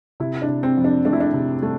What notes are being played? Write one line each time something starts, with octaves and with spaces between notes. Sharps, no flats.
C3 E4
D4
C3
C4
F2
D4
A3 D4
E4
D4
C3
A3